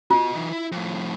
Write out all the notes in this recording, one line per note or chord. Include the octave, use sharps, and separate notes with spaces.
F4 F#4 D#5
E3 D#4
E4
F2 A2